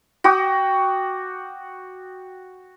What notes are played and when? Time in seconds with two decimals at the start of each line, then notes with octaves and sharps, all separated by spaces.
0.24 F#4 G5 D6 D#6